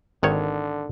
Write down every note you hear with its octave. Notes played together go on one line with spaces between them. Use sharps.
G#1 D3 D#3 C#5